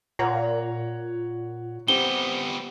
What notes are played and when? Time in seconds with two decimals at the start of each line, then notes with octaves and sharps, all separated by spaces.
0.19 A#2 C#5 F#5 A#5
1.88 G3 B3 C4 G4 G7